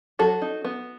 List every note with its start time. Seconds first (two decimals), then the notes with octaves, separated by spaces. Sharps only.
0.19 F#3 F#4 A4
0.42 D#4
0.65 B3